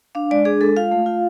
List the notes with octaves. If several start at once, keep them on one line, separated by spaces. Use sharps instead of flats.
D4 F5
G#3 D5
D4 G#4
G#3 A4
F4 F5
A3
F4